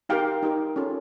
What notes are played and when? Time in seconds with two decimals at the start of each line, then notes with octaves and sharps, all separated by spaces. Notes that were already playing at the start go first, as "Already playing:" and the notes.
0.09 D#4 G4 A#4 F5 G5
0.42 D#4 G4 A#4
0.76 C#4 F4 A4